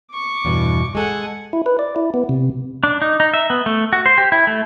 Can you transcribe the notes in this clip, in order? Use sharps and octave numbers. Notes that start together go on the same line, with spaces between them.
C#6 D6
E2 G2 B2
G#3 A4 F#5 G#5
E4
B4
D5
E4
B3
C3
D4
D#4
D#4
E5
B3
A3
F#4
C5
G4
E4
A3